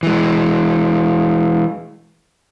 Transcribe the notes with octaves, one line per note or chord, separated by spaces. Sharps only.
E3 G#3